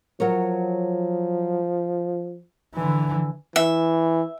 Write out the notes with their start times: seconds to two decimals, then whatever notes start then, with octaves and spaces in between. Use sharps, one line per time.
0.20 F3 F#3 A#4 C#5
2.74 D3 E3
3.56 E3 E5